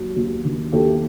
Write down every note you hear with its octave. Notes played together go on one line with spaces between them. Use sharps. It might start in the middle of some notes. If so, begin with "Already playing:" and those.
Already playing: D#2 F#3
D#2
D#3
D#2 G4 A4